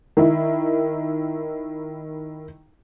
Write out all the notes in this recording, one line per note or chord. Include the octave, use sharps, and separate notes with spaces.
D#3 E4